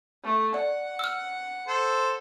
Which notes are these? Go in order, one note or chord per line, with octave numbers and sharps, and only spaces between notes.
A3
D5 F#5
E6 F6
A4 C5